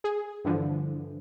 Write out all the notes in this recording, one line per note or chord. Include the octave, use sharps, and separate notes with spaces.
G#4
G2 D3 E3 F3